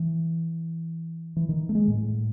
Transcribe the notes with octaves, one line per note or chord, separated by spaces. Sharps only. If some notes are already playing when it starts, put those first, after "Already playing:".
Already playing: E3
E3
D#3
A3
G#3
A2